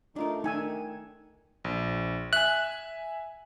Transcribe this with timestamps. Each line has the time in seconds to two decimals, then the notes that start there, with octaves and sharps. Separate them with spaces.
0.16 A3 D4 D#4 F4 A#4
0.44 D#3 A3 D4 D#4 G#5 E6
1.64 A#1
2.33 E5 G#5 F#6